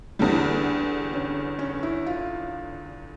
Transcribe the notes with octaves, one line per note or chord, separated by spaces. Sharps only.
E2 D3 G3 E4
C#4
C#4
E4
F4